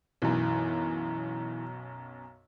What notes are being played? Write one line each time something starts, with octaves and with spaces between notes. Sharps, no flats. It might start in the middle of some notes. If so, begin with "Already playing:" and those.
B1 F#2 E3